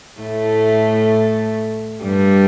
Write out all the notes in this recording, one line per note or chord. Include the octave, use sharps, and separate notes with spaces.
A2 A3
G2 G3